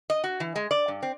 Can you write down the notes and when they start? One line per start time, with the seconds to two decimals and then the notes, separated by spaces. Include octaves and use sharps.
0.10 D#5
0.24 F#4
0.40 E3
0.56 G#3
0.71 D5
0.88 G2
1.03 C4